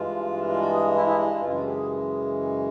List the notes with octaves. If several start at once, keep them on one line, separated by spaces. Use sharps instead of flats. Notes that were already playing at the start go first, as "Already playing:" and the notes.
Already playing: G2 E3 G#3 F4
F4
F#4
G#4
E4
E4
F#2 C#3 E3 G#3 F4
F#4
G4
G#4